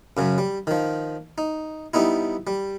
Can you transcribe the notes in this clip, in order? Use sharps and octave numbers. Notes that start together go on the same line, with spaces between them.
F#2 C#3 F#3
G3
D#3 F3
D#4
G3 B3 D#4 E4
G3